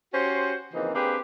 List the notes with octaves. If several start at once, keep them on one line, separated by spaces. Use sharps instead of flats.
C#4 F#4 G4 C5
C#3 E3 F3 A#3 C4 D#4
A#3 C4 D4 G4 G#4 B4